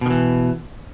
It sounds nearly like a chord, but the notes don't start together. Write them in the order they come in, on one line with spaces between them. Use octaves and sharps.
B2 D#3 E3